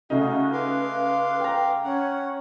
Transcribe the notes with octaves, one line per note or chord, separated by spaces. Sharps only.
C#3 A3 D#4 F#4
B4 F5 C6 D6
G5 A#5
C#4 F#5